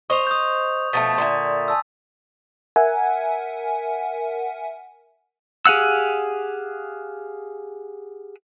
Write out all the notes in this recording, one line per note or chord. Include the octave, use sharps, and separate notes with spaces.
C5 D#5 C#6 F7
D#6 G6
B2 F3 A3 D#6 A6 B6
A#2 D3 E5 C6
G#5 A5 E6
A#4 E5 F#5 G#5
G4 G#4 F5 F#5 E6